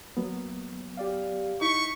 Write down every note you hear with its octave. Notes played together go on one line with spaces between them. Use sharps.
F#3 A#3 B3
G4 D5 F5
D#4 E4 C#6 B6